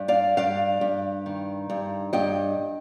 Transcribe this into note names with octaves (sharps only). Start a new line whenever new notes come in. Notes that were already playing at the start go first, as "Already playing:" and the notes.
Already playing: G2
D5 F5
G2 D5 F5
G2
D#3
G2
G2 D#5 G5